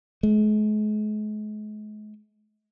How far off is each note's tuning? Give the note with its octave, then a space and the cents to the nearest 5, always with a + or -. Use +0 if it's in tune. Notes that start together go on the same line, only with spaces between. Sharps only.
G#3 +40